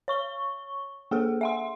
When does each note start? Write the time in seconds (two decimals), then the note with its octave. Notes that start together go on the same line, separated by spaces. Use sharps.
0.08 C#5 C#6 G7
1.11 A#3 G#4 A4
1.41 E5 F#5 C6